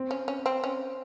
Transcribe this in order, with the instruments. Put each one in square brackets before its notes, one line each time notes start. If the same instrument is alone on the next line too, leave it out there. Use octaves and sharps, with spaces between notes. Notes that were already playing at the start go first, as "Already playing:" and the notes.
Already playing: [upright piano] C4
[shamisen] C#4
C#4
C4
C#4